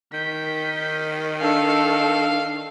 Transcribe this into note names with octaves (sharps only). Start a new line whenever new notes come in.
D#3 G6 B6
D4 A4 F5